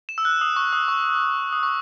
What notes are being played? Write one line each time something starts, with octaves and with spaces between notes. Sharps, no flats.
E7
E6
F#6
D#6
C#6
D#6
C#6
D#6
C#6